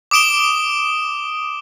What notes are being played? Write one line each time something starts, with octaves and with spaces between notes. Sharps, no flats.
D6 D#6 D7 E7 G7